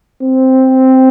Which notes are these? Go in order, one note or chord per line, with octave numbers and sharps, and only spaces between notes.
C4